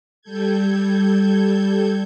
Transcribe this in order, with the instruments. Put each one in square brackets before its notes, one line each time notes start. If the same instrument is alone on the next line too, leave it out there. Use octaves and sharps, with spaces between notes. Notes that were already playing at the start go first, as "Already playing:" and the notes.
[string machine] G3 A4 G6 G#6